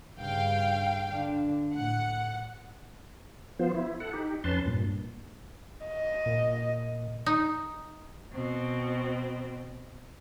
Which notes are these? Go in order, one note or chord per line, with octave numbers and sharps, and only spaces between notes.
G2 C#3 F5 G5
D3 D4
A2 F#5
F3 B3 F4 C5
E4
A4 F#5
D#4 G4
F2 C#4 B4 A5 C6
G2 A#2
D#5
A#2
D#4
B2 C4